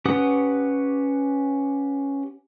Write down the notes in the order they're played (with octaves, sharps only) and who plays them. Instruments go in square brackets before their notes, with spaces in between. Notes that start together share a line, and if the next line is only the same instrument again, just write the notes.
[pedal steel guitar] C#4 G4 B4 F#5 D#6